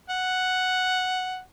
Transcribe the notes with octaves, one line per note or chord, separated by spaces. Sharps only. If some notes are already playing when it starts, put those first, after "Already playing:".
F#5